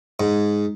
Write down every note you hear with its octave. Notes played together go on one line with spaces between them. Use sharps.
G#2